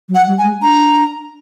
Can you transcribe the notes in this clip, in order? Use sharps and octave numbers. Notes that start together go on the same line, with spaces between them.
F#3
F#5
G3
G#5
G#3
D4 A#5